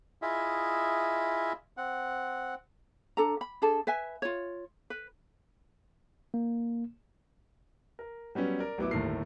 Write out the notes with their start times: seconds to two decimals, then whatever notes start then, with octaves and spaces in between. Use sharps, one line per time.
0.22 E4 F4 G#4 D#5 E5
1.77 C4 F#5
3.17 D4 A4 A#5
3.41 B5
3.62 D4 G#4 A4 A5
3.87 B4 E5 G#5
4.22 F4 C#5
4.90 B4
6.34 A#3
7.99 A#4
8.35 F#3 G3 B3 C#4
8.59 A#4 D5
8.78 A1 F#3 B3 E4 D6
8.91 G1 D#2 A2 A3 A#4 C7